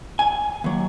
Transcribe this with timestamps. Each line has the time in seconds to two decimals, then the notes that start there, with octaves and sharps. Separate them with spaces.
0.19 G#5
0.64 D#2 F#3